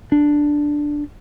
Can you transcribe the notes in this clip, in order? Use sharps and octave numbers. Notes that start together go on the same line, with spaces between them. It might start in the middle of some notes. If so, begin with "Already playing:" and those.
D4